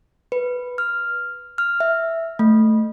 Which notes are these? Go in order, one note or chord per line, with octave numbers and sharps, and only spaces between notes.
B4
F6
F6
E5
A3